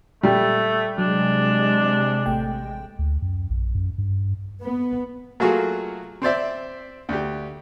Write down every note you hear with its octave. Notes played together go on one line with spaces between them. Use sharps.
A#2 G3 A3
C3 F#3 G#3 D4
A1 A3 G5
D2
F#2
A#1
F#2
G2
B3
F#3 A3 A#3 F4 F#4 G#4
C4 C5 D5 E5
D2 G4